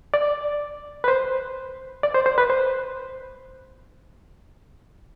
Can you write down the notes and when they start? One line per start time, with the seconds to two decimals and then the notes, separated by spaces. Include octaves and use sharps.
0.14 D5
1.04 B4
1.08 C5
2.03 D5
2.14 C5
2.26 C5
2.38 B4
2.50 C5